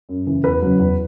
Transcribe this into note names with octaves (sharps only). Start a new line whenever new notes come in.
F#2
C#3 E3
E2 B4
C#3 F#3
E2